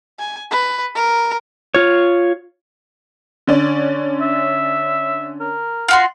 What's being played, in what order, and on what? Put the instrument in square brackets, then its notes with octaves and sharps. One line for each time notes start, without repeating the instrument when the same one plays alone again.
[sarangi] G#5
B4
A#4
[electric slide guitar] F4 C#5
[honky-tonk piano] D3 C#4 D5
[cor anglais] E5
A#4
[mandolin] F4 F#4 C6